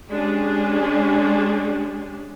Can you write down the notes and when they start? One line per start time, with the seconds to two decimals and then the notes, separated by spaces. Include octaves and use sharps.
0.11 G#3 C#4 D4 G4 G#4